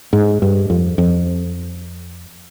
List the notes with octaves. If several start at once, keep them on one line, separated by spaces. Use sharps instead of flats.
G#2
G2
F2
F2